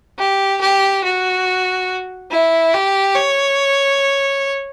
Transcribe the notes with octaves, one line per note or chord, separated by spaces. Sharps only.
G4
G4
F#4
E4
G4
C#5